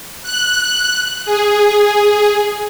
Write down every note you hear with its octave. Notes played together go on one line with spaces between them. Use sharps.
F#6
G#4